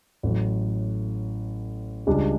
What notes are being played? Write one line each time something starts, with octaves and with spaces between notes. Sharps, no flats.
A1 A2 F#3
C#2 C#3 G3 D4